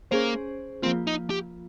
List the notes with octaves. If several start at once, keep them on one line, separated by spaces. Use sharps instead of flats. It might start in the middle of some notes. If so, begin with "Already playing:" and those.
A#3 C#4 G#4 C5
F3 A#3 C4 F4
D#4
G4